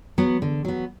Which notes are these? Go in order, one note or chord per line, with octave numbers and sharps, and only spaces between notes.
F#3 B3
D3
F#3 B3